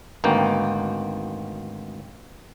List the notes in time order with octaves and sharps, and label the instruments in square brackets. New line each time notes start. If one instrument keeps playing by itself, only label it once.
[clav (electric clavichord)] G#1 D2 A#3 B3 G5